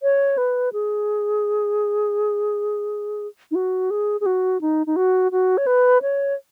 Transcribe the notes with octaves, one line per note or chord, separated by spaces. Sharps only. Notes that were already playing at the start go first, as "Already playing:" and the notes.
C#5
B4
G#4
D#4
F#4
G#4
G#4
F#4
D#4
D#4
F#4
F#4
C#5
B4
C#5